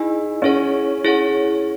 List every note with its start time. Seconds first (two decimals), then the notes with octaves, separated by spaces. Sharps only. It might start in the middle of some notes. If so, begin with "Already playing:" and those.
Already playing: D#4 E4 G#4 D#5 G#5
0.42 C#4 E4 G#4 C#5 F#5
1.05 E4 G#4 C#5 F#5